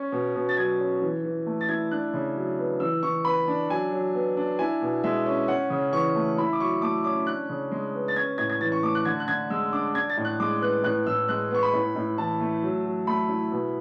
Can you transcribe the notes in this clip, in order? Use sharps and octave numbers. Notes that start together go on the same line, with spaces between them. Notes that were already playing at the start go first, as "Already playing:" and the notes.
Already playing: C#4
B2
B2
A6
F#3 G#6
C#4
E3
E3
A3
A6
E4 G#6
D4 F#6
C#3
F#3
B3
E3 E6
E3 C#6
B3 B5
D4
F#3 G#5
F#3
B3
D4
E4 G#5
B2
G#3 E5
C#4
C#4 F#5
C#3
E3 C#6
A3
E4 B5
D6
F#3 C#6
A3 D6
C#4 D6
D4 F#6
C#3
G#3
B3
A6
C#4 G#6
A2 G#6
G#6
E3 A6
C#6
A3 D6
F#6
D3 G#6
F#6
D3 G#6
G#3 E6
D4 D6
D4 G#6
A6
A2
F#6
G#3 D6
B3 F#6
A2 F#6
A2 E6
G#3 F#6
B3 C#6
B5
A2
A2
E3 A5
A3
F#3
F#3
A3 B5
E4
B2